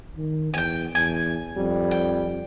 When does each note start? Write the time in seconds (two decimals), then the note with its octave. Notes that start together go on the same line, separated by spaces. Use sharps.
0.17 D#3
0.54 E2 G5 G#5
0.95 E2 G#5
1.57 F2 G3
1.91 G5